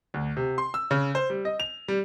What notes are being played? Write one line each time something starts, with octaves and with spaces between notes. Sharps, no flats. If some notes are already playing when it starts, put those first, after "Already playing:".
D2
C3
C6
E6
C#3
C5
G3
D#5
F7
G3